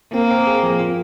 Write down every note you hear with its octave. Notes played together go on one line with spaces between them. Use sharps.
A#3 C4
C4
G#4
F3
F4